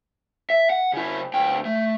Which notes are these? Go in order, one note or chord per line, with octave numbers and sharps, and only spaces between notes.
E5
F#5
C#3 E4
D2 G5
A3